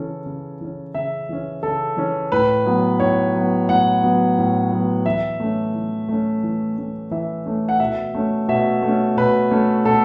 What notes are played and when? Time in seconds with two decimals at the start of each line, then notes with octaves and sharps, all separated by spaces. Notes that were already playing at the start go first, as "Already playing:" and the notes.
Already playing: C#3 E3 C#4 A4
0.26 C#3
0.61 E3 C#4
0.94 C#3 E5
1.29 E3 C#4
1.63 C#3 A4
1.97 E3 C#4
2.32 A2 B4
2.66 F#3 B3
3.00 A2 C#5
3.34 F#3 B3
3.68 A2 F#5
4.03 F#3 B3
4.38 A2
4.71 F#3 B3
5.06 E3 E5
5.40 A3 C#4
5.74 E3
6.08 A3 C#4
6.43 E3
6.77 A3 C#4
7.11 E3 E5
7.46 A3 C#4
7.69 F#5
7.79 B2 E5
8.15 A3 C#4
8.48 B2 E5
8.82 A3
8.88 C#4
9.17 B2 B4
9.51 A3 C#4
9.85 B2 A4